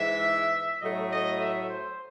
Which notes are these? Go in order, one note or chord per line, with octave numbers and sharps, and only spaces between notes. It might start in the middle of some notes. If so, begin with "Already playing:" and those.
Already playing: G#2 E3 G#3 E5
A2 F#3 A3 D#5
D#5
E5
C5